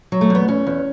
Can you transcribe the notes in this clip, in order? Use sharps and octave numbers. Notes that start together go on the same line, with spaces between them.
F#3
A3
E2 B3
E2 C#4
E2